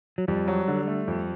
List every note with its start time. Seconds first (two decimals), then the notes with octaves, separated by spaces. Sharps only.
0.18 F#3
0.28 F2 G3
0.48 F#3
0.68 D3
0.87 A3
1.08 F2